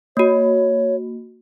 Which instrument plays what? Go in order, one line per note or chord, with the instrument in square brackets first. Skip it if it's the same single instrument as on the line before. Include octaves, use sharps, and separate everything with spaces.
[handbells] A#3 F#4 [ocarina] C#5